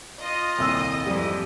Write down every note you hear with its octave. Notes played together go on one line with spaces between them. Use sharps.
F4 D#5
D#1 C2 E6
F2 G#2 E3 G3